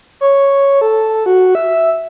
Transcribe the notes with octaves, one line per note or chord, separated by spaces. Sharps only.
C#5
A4
F#4
E5